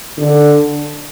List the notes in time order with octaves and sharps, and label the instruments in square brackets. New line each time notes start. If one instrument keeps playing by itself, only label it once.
[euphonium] D3